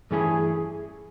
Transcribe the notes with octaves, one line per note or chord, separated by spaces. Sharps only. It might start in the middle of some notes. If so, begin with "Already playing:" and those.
G2 E3 A3 C#4 E4 G#4